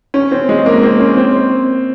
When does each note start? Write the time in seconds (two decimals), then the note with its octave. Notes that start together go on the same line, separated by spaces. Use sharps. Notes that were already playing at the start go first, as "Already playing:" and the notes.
0.14 C#4
0.32 C4
0.49 G#3
0.66 A#3
0.83 C4
0.99 C#4
1.17 C4